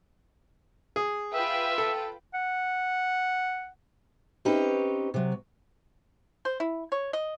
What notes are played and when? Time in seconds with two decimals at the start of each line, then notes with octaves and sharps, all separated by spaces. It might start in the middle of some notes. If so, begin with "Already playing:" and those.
0.96 G#4
1.32 F4 B4 E5 G5
1.78 A4
2.34 F#5
4.45 C4 C#4 D#4 G4 B4
5.14 C3 F#3
6.45 C5
6.60 E4
6.92 C#5
7.13 D#5